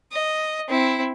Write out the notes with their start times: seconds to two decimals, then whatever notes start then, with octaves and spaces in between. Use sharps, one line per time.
0.12 D#5
0.69 C4 E4